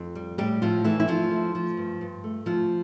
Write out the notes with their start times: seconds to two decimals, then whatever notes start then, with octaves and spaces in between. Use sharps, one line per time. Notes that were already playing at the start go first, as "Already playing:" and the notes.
Already playing: F2
0.15 G3
0.38 A2 G3 G4
0.62 A2 F3 F4
0.84 E3 A3 E4
1.00 E4
1.08 F2 F3 F4
1.31 A3
1.55 F3
1.77 G2
2.01 G2
2.24 A3
2.46 D2 F3 F4